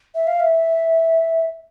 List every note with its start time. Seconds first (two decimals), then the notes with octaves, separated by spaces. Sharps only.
0.15 E5
0.27 F5
0.39 E5